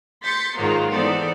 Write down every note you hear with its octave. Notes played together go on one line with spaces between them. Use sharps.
C6 G6 A6 B6 C#7
G#2 D#3 F#3 G#3 A#3 F4
E3 B3 D#4 A4 C5 D5